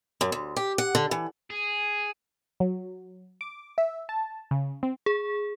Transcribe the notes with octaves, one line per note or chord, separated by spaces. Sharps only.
F#2
D2
G4
F#5
D3
E3
G#4
F#3
D6
E5
A5
C#3
C4
G#4